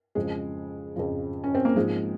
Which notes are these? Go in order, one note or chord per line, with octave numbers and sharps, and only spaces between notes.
F2 C#3 F3 G#3
F2 C#3 F3
C#4
C4
A#3
G#2 F3 G#3